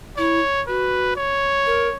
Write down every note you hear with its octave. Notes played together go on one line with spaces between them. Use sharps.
E4 C#5
F#4 B4
C#5
A#4